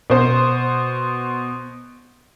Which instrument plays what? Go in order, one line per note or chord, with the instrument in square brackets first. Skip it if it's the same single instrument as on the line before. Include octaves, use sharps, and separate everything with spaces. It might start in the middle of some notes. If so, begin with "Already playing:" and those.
[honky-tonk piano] B2 C5